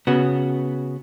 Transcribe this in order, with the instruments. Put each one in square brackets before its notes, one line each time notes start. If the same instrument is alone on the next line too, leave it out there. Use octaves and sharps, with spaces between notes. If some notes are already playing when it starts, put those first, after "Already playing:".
[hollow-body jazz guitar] C#3 B3 F#4